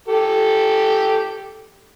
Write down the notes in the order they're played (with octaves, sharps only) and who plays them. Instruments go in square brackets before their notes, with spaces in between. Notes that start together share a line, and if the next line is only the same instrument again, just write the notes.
[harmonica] G4 A4